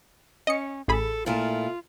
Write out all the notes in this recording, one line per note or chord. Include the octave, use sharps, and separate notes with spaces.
C#4 D#5 C#7
A1 G#4 A4 B5
A#2 A3 E4 F4